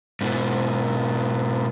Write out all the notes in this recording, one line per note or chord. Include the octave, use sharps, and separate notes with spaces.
G#2 B2